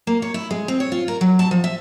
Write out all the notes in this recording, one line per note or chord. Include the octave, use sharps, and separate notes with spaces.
A#3
C#5
E4
G#3
C4
C#5
F4
A#4
F#3
A5
F3
E5